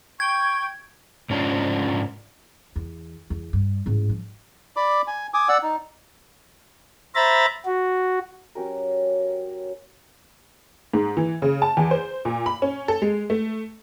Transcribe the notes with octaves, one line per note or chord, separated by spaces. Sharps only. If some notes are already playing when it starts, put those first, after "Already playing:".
G5 C#6 G#6
G#2 C#4 D4 F4
E2
E2
G2
A1 G#2
F3
D5 B5 D6
G#5
G#5 D6 D#6
D5 F#5 E6
D#4
C5 E5 A#5 B5 A6
F#4
F#3 C#4 G4 A#4
G#2
E3
C#3
A5
E2
C5
A#2
B5
C#4
A4
G#3
A3